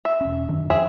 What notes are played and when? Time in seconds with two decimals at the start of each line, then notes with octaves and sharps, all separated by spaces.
0.05 E5
0.21 E1 C#4
0.49 F#2 D#3 D4
0.70 F2 C4 G#4 E5